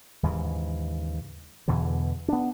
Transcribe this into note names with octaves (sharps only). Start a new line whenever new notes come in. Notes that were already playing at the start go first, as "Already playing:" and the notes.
D#2 G#2 C#3 E3
E2 B2 D3 E3
B3 D4